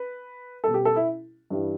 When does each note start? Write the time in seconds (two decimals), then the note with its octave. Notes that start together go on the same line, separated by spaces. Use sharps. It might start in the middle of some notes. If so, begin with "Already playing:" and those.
Already playing: B4
0.64 B2 G3 A4
0.74 G4
0.85 A4
0.96 E4
1.50 G2 E3 G3